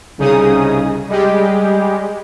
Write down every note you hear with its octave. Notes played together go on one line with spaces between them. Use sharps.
C2 C#3 D#4 G#4 D#6
G3 G#3 G4